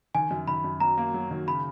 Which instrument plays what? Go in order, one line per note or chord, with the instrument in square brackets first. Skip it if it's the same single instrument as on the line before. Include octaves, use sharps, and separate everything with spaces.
[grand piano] D#3 [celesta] G#5
[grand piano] F#2
[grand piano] D#3 [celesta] B5
[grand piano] F#2
[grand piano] F#3 [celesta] A#5
[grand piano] A#3
F#3
D#3
[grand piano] C#3 [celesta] B5